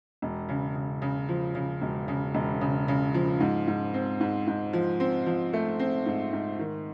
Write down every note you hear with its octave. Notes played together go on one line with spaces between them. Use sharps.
E1
C#3
C#3
C#3
F3
C#3
E1
C#3
E1
C#3
C#3
F3
G#2
G#2
C4
G#2
G#2
F3
C4
F3
A3
C4
G#2
G#2
D#3